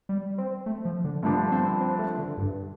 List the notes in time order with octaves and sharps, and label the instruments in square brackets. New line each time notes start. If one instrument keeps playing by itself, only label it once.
[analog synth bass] G3
C4
A3
F3
D3
[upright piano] G2 D3 F3 D4 [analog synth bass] A3
[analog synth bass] C4
C4
A3
D3
G2